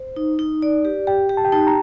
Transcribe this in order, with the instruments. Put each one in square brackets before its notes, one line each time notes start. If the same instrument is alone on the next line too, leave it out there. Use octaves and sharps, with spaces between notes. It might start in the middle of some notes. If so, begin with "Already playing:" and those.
Already playing: [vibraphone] C5
D#4
D#4
D5
G4
[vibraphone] G4 [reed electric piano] G5
[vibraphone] G4
[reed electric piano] A5
G5
[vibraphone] D#4 [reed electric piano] A5
[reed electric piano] A#5